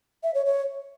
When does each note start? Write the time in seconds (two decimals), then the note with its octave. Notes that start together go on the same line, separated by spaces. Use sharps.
0.23 E5
0.34 C#5
0.45 C#5